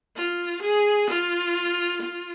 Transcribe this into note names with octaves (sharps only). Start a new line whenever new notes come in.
F4
G#4
F4
F4